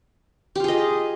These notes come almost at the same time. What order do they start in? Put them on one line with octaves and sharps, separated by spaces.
G4 F4 G#4 D#5